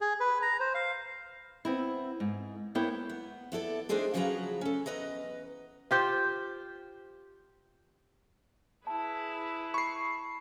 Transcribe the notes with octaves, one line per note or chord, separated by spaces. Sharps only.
G#4
B4
A#5
C5
F5
B3 C4 E4
G#2
A#3 B3 E4 C#5 G5
B3
B3 E4 A4 D5
G#3 C4 D4 D#4 G#4 A4
C#3 F3 F#3 G#4 B4 A#5
C#4 A4
E2 B4 D#5 A#5
F4 G4 C5
E4 G#4 B4 A5
B5 C#6 C7